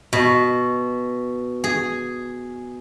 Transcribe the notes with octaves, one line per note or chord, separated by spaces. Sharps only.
B2
G#4